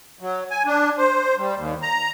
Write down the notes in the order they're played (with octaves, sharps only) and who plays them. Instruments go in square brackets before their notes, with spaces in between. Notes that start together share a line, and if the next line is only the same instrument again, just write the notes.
[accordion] F#3
G#5
D4
C5
G3
D#2
A#5